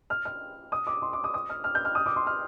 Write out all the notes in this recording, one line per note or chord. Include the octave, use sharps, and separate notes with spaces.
F6
F6
D#6
D6
C6
D6
D#6
D#6
F6
F6
G6
F6
D#6
D6
C6
F6